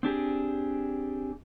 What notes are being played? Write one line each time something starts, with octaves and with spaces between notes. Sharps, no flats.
C4 D4 G4 G#4